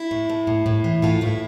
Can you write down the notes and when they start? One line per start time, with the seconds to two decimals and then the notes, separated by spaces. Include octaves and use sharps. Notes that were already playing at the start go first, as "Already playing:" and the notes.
Already playing: E4
0.11 A2
0.29 A2
0.47 A2
0.66 A2
0.84 E3
1.02 A2 F4
1.21 A2 E4